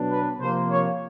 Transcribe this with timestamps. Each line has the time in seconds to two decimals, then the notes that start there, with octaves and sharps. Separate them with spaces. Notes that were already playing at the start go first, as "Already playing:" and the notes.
Already playing: B2 F#3 B3 D4
0.10 B4
0.40 C3 F3 A#3 C5
0.70 C#5